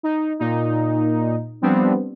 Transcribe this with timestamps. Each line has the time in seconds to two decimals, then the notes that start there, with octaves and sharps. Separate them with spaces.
0.03 D#4
0.39 A#2 D#4
1.62 F3 G3 B3 C4 D4